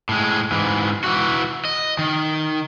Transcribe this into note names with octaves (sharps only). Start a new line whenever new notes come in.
A2 G#3
G#2 E3
E3 F#4
D#5
D#3